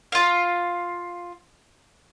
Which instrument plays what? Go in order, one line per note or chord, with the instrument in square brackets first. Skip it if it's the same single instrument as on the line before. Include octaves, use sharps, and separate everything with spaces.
[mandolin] F4 F5